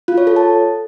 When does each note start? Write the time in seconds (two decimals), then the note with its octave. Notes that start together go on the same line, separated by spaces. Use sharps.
0.08 F4
0.18 C#5
0.27 A4
0.36 A5